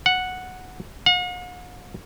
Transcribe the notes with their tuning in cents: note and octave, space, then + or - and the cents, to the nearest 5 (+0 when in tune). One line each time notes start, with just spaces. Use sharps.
F#5 -5
F#5 -45